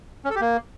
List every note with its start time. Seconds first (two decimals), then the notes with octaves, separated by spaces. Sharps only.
0.25 C#4
0.30 A4
0.35 G4
0.41 A#3